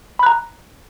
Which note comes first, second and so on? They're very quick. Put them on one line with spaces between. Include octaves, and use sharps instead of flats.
B5 F#6 A#5